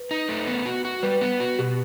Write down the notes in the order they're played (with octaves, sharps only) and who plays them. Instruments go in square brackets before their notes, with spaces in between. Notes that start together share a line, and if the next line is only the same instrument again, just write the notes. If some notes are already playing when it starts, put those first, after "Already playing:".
Already playing: [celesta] B4
[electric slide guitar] D#4
A3
B3
F#4
F#4
[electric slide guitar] G3 [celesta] B4
[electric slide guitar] B3
F#4
[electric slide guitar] B2 [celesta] G4